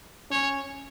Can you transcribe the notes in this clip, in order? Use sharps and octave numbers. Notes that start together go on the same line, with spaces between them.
C#4 C#5